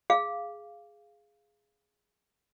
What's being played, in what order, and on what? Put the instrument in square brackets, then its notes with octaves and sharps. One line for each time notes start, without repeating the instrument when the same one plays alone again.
[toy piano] G#4 F5